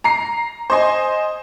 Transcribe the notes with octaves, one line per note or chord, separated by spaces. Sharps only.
A#5 C7
C5 D#5 G#5